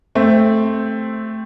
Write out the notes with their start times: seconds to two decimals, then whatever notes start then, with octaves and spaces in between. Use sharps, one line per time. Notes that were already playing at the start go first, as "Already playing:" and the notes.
0.15 A3 C4